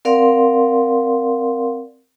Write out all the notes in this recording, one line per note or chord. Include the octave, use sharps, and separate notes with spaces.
C4 A#4 D5 F5 F#5 C6